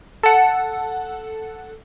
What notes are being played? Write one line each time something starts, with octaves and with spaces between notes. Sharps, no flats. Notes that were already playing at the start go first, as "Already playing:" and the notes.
A4 F#5